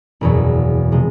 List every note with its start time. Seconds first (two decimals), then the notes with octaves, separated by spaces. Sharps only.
0.21 F#1 E2 B2 F#3
0.92 C3 F3 G#3